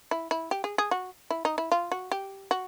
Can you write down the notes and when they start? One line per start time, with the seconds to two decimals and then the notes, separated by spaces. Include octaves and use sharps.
0.11 E4
0.31 E4
0.51 G4
0.64 G#4
0.78 G#4
0.91 F#4
1.30 E4
1.45 D#4
1.58 E4
1.72 F4
1.91 F#4
2.12 G4
2.51 F#4